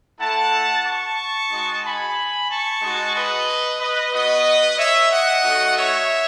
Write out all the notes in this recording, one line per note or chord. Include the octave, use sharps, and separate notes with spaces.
A3 E4 F#5 A5
A5 C#6
G#3 D#4 F#4
G#5 B5
A5 C#6
G#3 D#4 F#4
B4 D#5
B4 D#5
B3 F#4 B4 D#5
C#5 E5
D#5 F#5
A3 D#4 F#4
C#5 E5